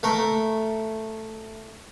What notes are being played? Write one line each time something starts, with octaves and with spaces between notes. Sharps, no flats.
A3 A#4